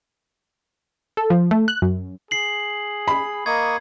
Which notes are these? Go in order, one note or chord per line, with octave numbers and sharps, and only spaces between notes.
A4
F3
A3
F#6
F#2
G#4 C7 F#7
B5
A#3 D#5 C#6 D#6 G#6